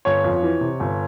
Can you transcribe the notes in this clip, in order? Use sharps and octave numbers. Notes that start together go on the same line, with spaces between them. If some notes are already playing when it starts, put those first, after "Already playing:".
G1 C#5
F2
E3
C3
G1